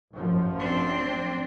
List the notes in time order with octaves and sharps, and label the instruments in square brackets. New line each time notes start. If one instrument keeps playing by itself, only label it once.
[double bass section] A1 F#2 F3
[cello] C4 D4